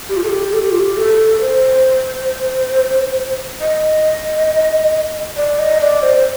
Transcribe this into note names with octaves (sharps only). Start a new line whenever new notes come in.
G4
F4
A4
G4
A4
G4
F4
G4
A4
C5
D#5
D5
D#5
D5
C5